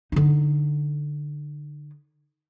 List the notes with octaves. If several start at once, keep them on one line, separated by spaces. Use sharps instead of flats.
D3 D#4